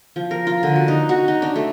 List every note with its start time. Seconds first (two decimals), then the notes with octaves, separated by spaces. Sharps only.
0.16 F3
0.31 A#4
0.47 F4
0.63 D3
0.76 F#4
0.88 D#4
1.09 F#4
1.28 D#4
1.42 D4
1.56 A3